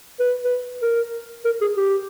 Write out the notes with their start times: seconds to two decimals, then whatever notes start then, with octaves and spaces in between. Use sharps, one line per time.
0.20 B4
0.45 B4
0.82 A#4
1.45 A#4
1.61 G#4
1.77 G4